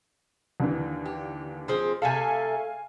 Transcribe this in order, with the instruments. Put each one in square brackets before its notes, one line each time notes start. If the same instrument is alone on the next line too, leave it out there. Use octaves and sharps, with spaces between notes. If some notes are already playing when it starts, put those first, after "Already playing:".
[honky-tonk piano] D#2 D3 E3
[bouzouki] G4
F3 G#3 C4
[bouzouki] C3 A3 A4 [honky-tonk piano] F5 G#5